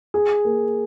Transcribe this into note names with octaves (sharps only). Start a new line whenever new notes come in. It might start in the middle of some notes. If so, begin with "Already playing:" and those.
G#4
A#3